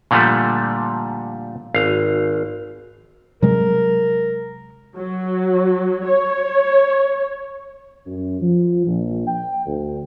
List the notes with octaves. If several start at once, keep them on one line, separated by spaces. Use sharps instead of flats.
A#2 D3 F3 G3 A3
G#1 F5
C3 F#3 G#3 A#4
F#3
C#5
F#2
F3
A#1
G5
D2